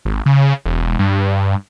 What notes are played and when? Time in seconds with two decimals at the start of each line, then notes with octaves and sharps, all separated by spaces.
0.05 G#1
0.26 C#3
0.66 E1
0.99 G2